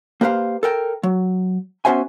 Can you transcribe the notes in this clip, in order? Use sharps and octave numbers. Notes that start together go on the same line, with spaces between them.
A#3 G4 B4 C5 F5
A4 A#4 G5
F#3
B3 C#4 F#4 C5 E5 G#5